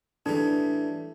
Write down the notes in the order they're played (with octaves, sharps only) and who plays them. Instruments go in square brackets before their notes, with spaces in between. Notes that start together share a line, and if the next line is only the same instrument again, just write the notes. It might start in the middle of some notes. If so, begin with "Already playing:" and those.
[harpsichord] A2 E3 G3 [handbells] D4